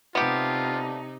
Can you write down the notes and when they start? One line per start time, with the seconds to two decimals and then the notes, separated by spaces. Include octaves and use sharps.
0.15 C3 A3 B3 D4 D#4 F4 G4